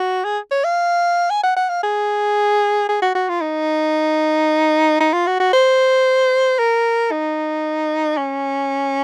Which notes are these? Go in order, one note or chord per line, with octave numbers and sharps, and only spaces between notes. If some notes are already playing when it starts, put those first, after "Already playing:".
Already playing: F#4
G#4
C#5
F5
G#5
F#5
F#5
F5
G#4
G#4
F#4
F#4
F4
D#4
D#4
F4
F#4
F#4
C5
A#4
D#4
C#4